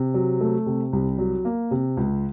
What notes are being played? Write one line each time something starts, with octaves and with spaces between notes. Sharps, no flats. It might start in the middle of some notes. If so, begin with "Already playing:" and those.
Already playing: C3
F#3
A3
C3
C2
F#3
A#3
C3
C#2